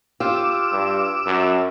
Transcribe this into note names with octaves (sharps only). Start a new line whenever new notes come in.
F4 G4 D6 E6
G2
F#2